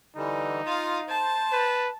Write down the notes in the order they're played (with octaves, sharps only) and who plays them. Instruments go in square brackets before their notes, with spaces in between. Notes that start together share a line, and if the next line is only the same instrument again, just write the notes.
[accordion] D3 E3 G3 [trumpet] D#4
[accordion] F4 D#6 [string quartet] F5
[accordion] C5 [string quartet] A5
[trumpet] B4